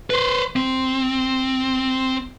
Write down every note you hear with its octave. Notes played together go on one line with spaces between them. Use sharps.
B4 C5
C4